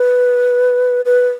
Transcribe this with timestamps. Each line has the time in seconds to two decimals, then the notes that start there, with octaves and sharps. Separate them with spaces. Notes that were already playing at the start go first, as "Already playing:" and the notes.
Already playing: B4
1.05 B4